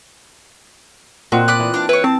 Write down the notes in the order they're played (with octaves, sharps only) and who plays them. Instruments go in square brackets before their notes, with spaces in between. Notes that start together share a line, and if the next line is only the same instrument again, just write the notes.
[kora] A#2 C4 D#5 [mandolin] F#4
[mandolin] D5 B5 D#6 [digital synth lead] F#6
[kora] E3
[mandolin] D4 F5
[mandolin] E4 C#5 [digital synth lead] B4
[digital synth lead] C4 [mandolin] A5